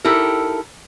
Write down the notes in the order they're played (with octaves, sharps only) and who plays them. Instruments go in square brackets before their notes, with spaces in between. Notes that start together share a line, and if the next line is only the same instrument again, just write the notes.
[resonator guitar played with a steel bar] D#4 E4 G4 A4 A#4